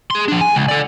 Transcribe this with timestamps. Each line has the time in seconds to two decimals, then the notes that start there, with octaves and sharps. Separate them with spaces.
0.11 G#4 C6
0.28 F3 D4
0.41 G#5
0.55 C#2
0.69 A4 D5